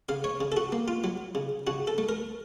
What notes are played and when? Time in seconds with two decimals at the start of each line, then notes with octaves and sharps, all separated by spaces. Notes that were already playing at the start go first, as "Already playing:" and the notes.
0.09 C#3 F5
0.24 C#5
0.41 C#3
0.52 A4
0.57 F#4
0.72 A#3
0.88 F4
1.04 F#3
1.35 C#3
1.67 C#3 F#4
1.87 A4
1.98 A3
2.09 A#4